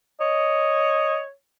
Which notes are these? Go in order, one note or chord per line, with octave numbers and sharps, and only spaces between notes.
C#5 D#5